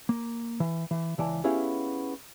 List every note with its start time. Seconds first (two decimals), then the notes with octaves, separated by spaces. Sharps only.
0.09 A#3
0.60 E3
0.91 E3
1.18 C#2 E3 D5 A5
1.44 B3 C#4 E4 G4 G#4 F5